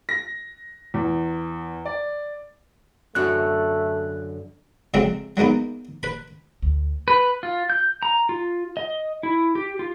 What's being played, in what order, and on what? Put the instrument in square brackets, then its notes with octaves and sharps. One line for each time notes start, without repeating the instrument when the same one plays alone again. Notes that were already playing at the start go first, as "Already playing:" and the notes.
[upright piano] A#6
E2
D5
[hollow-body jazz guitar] F#2 D3 F#4 [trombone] A3 [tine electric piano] F#6
[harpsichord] F2 C#3 F#3 G#3 C4 C#4
F#3 G#3 A#3 B3 D#4
B4 B5
[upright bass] D2
[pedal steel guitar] B4
F4
G6
A#5
F4
D#5
E4
G4
F4